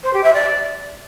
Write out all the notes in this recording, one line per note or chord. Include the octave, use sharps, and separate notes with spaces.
C5
G4
E5
D5